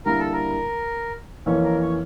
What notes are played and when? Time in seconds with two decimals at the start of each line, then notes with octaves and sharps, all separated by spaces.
0.05 D3 G3 A#3 E4 A#4
0.19 A4
0.33 A#4
1.46 F2 E3 A#3 C#4 C#5
1.64 A#4
1.81 C#5